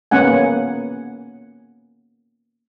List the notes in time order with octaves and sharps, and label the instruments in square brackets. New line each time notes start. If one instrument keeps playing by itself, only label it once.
[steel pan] A#3 B3 C#4 F#5 G#5